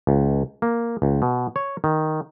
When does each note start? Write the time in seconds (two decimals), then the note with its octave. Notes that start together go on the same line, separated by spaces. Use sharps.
0.07 C#2
0.62 A#3
1.02 C#2
1.22 B2
1.56 C#5
1.84 D#3